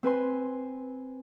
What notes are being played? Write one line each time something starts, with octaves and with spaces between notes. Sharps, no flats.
C4 B4 G#5 C6